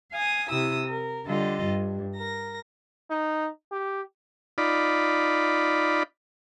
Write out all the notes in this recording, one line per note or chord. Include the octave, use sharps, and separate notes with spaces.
F5 G#5 D#6
C3 E4 D#6 E6
A#4
D3 G3 F4 A4 D#5
G2
A#4 A#6
D#4
G4
D#4 F4 D5 B5